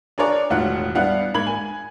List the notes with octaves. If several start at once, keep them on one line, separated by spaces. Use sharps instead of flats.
D4 G#4 A#4 C#5 D5
E1 A2 D#3 F4 F#5
G3 B3 D4 E4 F5 F#5
G#2 A#3 B5 G#6 F#7
G#5